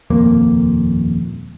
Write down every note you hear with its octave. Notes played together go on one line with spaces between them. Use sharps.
D#1 F2 A#3